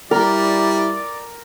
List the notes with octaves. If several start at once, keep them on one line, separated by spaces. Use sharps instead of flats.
G3 E4 A#4 D5